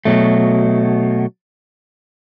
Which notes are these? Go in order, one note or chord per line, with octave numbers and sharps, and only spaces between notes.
B2 F#3 A3